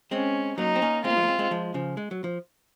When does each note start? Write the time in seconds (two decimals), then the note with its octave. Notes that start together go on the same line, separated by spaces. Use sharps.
0.11 G#3 C4 C#4
0.58 F#3 A#3 D#4
0.76 C4
0.82 A#3 C#4
1.04 G#3 C4 F4
1.10 A#3
1.16 F3 G#3
1.23 A#3
1.28 G#3 C4
1.39 G#3 C4
1.51 F3 G#3
1.74 C#3 F3
1.97 G#3
2.11 F#3
2.24 F3